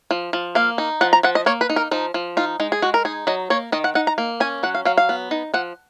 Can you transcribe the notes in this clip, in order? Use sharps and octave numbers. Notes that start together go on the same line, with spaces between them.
F3
F3
A#3 F5
D#4
F3 F#5
A#5
F3 F#5
D#5
A#3 C#5
B4
D#4
A#4
F3 D#4
F3
D#4 F4
G#3 D#4
G#4
G#3 F#4
A#4
D#4 G#4
F#3 D#5
A#3 C#5
D#3 D#5
F#5
D#4 F#5
A#5
A#3
C#4 G#5
F#3 F#5
F5
F#3 F5
F5
B3
D#4
F3 F#5